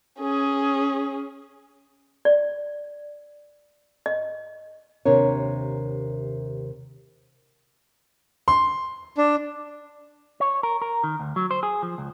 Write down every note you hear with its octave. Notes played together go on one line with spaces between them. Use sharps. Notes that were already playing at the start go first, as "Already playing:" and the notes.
C#4 G#4
D5
D#5
D#2 C3 D4 A#4 C#5
C6
D4
C#5
A#4
A#4
D#3
D2
F#3
C5
G#4
F3
C#2